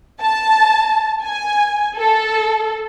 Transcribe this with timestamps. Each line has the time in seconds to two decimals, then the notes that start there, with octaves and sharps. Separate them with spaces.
0.20 A5
1.22 G#5
1.97 A4